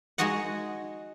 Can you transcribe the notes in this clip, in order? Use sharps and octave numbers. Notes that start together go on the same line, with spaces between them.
G#3 D#4 F#4 D#5 F#5